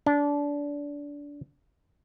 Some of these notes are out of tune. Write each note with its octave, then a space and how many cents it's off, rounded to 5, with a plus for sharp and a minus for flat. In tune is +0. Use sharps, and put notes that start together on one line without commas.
D4 -25